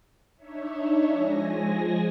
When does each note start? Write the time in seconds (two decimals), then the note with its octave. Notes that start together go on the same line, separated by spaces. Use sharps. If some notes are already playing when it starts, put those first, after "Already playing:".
0.36 D4 D#4 C#5 E5
1.09 F3 G#3 G#5 A#6